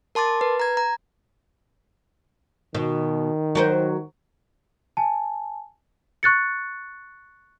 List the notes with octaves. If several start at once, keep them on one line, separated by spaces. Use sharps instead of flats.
A#4 A5 C6 D6 A6
B4
A#5 G#6
A#5
B2 D#3
F#3 A#4 C5
G#5 A5
C#6 F#6 A6 C#7